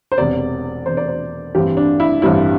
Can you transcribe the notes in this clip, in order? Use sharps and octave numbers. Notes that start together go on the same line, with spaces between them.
C5
E1 E2 C3 D5
E1 E2 C3 C5
D5
C5
A1 G2 E3 G3 C4 G4
D4
E4
A1 G2 E3 G3 C4 E4